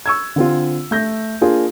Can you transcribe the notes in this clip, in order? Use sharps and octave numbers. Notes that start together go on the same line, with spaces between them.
C#6 E6 G#6
D3 C4 F4
A3 G6 A#6
A#3 D4 F4 G#4